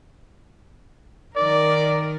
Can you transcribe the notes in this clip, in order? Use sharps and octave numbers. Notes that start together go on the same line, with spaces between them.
D#3 A#4 D5